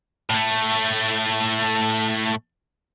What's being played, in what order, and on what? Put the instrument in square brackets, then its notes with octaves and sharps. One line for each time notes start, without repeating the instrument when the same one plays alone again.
[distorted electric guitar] A2 A3